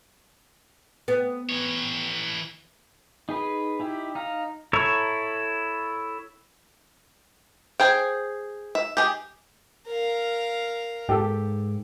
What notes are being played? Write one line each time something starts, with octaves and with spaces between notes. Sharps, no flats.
B3
E3 C#5
D#4 G#4 B4
D#4 E4 G4
D#4 F5 A#5
E4 A4 C#5 A#5 C#6
G#4 C5 G5
E5
G4 G#4
A#4 F5
G#2 G4 A4